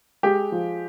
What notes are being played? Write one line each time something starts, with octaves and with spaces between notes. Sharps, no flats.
G#3 G4
F3